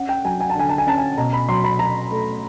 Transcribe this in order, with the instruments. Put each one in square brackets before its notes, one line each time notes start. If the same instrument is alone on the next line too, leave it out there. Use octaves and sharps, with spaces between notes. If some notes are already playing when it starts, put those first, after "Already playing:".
Already playing: [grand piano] C#4 F#5
G5
F#3 G#5
G#5
A5
D3 G#5
A5
G#5
C#4 A5
G#5
B2 A#5
B5
F#3 C6
B5
F#3 A#5
A3